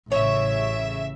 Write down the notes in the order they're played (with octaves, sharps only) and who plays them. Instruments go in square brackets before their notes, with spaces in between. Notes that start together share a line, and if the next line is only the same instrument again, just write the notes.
[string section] A1 C#3 E5 [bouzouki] C#5